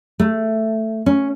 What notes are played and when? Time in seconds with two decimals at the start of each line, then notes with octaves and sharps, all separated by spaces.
0.20 A3
1.06 C#4